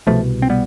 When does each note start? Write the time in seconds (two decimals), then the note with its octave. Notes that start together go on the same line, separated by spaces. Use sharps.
0.07 C2 B2 F3 A3
0.42 C4
0.50 G3 B3